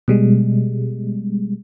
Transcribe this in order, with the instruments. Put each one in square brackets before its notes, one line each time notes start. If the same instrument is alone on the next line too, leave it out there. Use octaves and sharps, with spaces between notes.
[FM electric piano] B2 G3 G#3